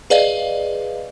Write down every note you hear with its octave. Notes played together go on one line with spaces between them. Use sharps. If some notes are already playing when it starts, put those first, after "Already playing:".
G#4 B4 D5 D#5 F5